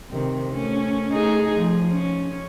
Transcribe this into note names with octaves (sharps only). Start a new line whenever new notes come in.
C3 D#3
A3 C#4
A3 D#4 G#4
F3
C#4